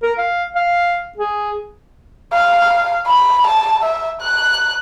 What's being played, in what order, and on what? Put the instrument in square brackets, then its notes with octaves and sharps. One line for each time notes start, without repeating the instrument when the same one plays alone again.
[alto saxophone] A#4
F5
F5
G#4
[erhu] F5
B5
A5
E5
F#6